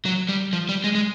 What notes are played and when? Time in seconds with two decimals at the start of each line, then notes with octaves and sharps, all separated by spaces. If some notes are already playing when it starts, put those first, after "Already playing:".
0.05 F#3
0.29 G3
0.53 F3
0.69 G3
0.84 G#3
0.95 G#3